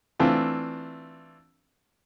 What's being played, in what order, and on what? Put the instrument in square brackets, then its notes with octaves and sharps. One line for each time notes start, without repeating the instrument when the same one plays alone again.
[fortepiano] E3 A3 C4 D4 F4